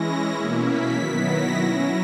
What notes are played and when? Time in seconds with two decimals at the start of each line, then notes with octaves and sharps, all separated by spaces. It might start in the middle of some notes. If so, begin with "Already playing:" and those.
Already playing: E3 G#3 C#4 E4 A#6
0.32 B2 A#3 C#4 E4
0.63 B6
0.94 D#3 F#3 B3 E4
1.24 A#6
1.55 F#3 C#4 E4